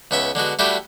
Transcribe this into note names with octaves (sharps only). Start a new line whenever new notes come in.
C#2 B3 C#4 E5
D3 G#3 B3 F#4
G3 A3 D4 E4 F#4 G4